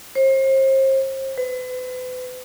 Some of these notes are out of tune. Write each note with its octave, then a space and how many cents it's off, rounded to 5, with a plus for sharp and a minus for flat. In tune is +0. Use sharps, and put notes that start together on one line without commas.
C5 +35
B4 +40